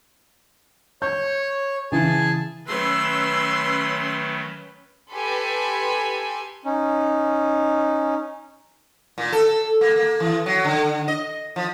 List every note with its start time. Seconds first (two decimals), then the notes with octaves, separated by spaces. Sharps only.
1.02 C#5 G6
1.92 C#3 E3 G#4 G#5 A5
2.68 D#3 F#3 A3 C#4 B4 C6 E6
5.13 G4 A4 B4 G#5 B5 C6
6.65 C#4 D#4
9.18 A#2
9.32 A4
9.81 A#3
9.96 A#3
10.20 E3
10.46 F#3
10.65 D3
11.08 D#5
11.56 F3